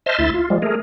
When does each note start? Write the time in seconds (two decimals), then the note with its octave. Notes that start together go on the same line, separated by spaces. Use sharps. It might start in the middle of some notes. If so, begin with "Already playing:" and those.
0.06 C5 D#5 E5 A5 C6 F6
0.19 D2 E4 E5 C6 A6
0.34 F4
0.50 F3 G3 G#3
0.62 A3 G#4 A#4